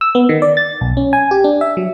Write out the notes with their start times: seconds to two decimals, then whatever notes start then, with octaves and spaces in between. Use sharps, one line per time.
0.01 E6
0.15 B3
0.29 D#3
0.42 D5
0.57 A6
0.81 B1
0.97 C#4
1.13 G#5
1.31 G4
1.44 D4
1.61 E5
1.77 F#3